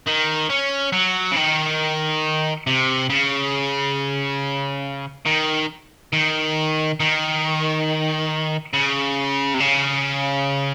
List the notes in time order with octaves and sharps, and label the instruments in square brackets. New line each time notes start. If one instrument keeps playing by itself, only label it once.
[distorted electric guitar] D#3
C#4
F#3
C#3
D#3
C3
C#3
D#3
D#3
D#3
C#3
C3
C#3